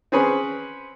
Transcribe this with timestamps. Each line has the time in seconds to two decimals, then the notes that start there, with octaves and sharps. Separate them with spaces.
0.12 C4 C#4 G#4 B4